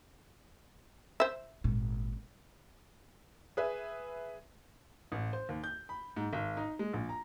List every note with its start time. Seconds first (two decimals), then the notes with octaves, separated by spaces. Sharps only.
1.20 C5 E5
1.64 G#1 A#2
3.57 G#4 B4 E5
5.12 A1
5.33 C5
5.49 D#2
5.64 G6
5.89 B5
6.16 G#2
6.33 G#1
6.57 D#4
6.79 G#3
6.93 A#1
7.09 A#5